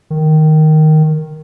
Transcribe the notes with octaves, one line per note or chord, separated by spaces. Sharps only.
D#3